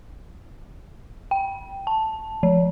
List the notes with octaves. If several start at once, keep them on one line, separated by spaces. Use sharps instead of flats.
G5
A5
F3